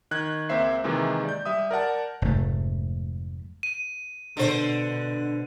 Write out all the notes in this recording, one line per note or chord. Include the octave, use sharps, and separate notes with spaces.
D#3 F#6 G#6
C#2 A#3 C4 C5 E5 C7
C3 D#3 E3 G#3 A#3
D5 G6
G3 E5 D#6
A#4 D5 F#5 A5
F1 G#2 F3 A3
D#7
B2 D3 C5